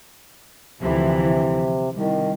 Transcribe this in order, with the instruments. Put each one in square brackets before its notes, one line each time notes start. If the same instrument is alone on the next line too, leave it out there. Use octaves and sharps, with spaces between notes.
[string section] D2 E3 F3 [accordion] C3
[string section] C2 [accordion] D#3